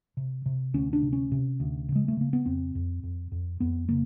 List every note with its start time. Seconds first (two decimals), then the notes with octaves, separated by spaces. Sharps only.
0.17 C3
0.46 C3
0.74 D2 C#4
0.93 D4
1.02 C3
1.13 C#4
1.32 C3
1.60 D2
1.89 C#3
1.95 G#3
2.08 A3
2.17 C#3 A#3
2.33 B3
2.46 F2 C4
2.75 F2
3.03 F2
3.32 F2
3.60 F2 B3
3.89 C#3 A#3